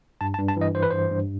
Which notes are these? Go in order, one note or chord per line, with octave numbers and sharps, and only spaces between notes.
G2 A5
A5
G2
A5
E3 D#5
E3 C5
B4
G2 C5
G2